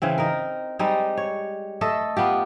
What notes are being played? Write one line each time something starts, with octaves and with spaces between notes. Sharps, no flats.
C#3 E3 C4
D#4 A#4
G3 G#3 C4 D#4
C#5
A3 A4 D#5
B3 F4 G4